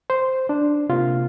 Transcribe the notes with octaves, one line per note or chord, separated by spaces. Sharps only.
C5
D4
C3 A#3 F4